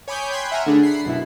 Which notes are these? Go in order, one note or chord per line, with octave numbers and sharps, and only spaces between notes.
C#5 G#5 B5 D6 D#6 G6
G5 B5 C6 F#6 G#6
E5 F#5 G#5 A#5 F6
D3 A3 D4 G#4
F#5 B5 C7
F#2 B2 E4